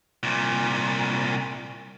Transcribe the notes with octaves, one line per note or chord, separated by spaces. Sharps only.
C2 A#2